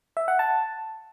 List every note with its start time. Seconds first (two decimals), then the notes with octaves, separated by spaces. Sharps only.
0.17 E5
0.28 F#5
0.39 A5